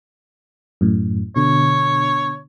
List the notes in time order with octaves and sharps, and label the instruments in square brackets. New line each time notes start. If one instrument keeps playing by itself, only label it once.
[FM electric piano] F#2 A2
[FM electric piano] B2 D3 [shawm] C#5